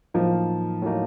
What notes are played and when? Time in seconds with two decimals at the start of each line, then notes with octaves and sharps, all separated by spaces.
0.14 A2 F3 F#3 A#3 D#4
0.82 A2 F#3 A#3 D#4